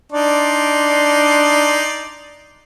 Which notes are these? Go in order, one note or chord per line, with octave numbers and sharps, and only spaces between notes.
D4 D#4 D5 C6